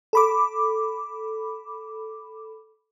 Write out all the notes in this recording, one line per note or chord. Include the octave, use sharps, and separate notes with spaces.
A4 B5 D6